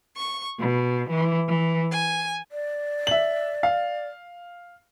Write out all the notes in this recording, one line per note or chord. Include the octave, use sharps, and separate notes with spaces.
C#6
B2
E3
E3
G#5
D5
E5 F#7
F5